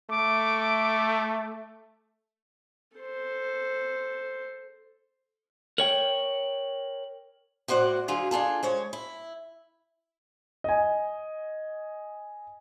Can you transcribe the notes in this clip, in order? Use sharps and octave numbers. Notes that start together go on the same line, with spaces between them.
A3 D6
A4 C5
A#4 C#5 G5 F#7
A2 F#4 C5 D5 F#5
D3 F#3 F4 G#4
D4 F4 G#4 A4
G#3 C5 C#5
E4
D#5 G#5